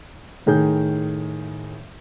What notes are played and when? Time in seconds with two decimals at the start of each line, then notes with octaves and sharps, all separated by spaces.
0.46 A2 D#3 G#4 G6